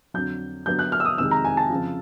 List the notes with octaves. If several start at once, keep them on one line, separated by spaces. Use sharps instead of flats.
F2 D3 F#3 G6
G2 D3 F#3 B3 G6
F#6
F6
E6
D#6
F2 C3 D#3 G#3 E6
A#5
G#5
A5
F2 C#3 F3